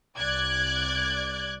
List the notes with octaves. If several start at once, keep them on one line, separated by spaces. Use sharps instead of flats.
C2 D5 F#6 G#6